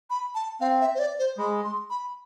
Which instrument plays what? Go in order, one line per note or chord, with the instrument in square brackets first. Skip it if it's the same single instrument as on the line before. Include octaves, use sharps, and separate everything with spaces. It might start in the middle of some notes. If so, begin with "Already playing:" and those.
[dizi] B5
A5
[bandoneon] C4 [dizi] F5
[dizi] E5
C5
D5
C5
[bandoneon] G#3 [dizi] B5
[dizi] C6
B5